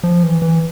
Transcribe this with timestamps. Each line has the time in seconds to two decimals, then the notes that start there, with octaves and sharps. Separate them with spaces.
0.03 F3
0.23 E3
0.42 E3